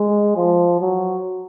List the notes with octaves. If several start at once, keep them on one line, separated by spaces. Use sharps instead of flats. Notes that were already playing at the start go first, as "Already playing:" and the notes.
Already playing: G#3
F3
F#3